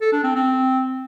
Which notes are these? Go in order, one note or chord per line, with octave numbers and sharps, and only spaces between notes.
A4
D4
C4
C4